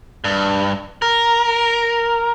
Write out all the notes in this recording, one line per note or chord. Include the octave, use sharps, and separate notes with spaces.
G2
A#4